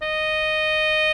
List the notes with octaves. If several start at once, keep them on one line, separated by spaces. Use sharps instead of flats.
D#5